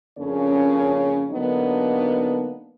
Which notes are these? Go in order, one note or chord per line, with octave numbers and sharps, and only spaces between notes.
F2 C#3 A#3 C#4 D4 C#5
D3 F#3 A#3 B3 D4 D#4